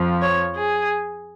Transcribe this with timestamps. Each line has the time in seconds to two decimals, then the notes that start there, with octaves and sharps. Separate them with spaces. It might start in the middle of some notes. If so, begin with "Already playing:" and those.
Already playing: F2 F3
0.21 C#5
0.55 G#4